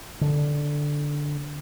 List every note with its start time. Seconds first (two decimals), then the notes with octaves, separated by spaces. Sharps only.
0.21 D3